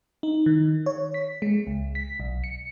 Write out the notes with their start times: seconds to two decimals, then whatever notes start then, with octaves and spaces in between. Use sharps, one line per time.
0.23 D#4
0.46 D#3
0.86 C#5
1.14 B6
1.42 G#3
1.67 C#2
1.95 B6
2.20 B1
2.44 C#7